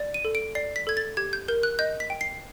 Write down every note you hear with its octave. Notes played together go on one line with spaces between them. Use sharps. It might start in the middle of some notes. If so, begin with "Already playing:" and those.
Already playing: D5
D#7
A4
D7
D5 C7
B6
A4 G#6
A6
G4 G#6
G6
A#4 G6
F#6
D#5 G6
B6
G5
C7